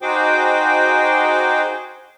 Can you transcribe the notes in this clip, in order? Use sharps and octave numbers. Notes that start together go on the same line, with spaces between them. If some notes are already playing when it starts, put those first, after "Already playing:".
D#4 F#4 G#4 C5 G5 D6